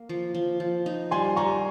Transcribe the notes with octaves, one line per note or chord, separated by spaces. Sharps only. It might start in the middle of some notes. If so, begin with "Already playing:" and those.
Already playing: A#3
F3
F3
F3
D#4
G3 G#5 C6
G3 A#5 C#6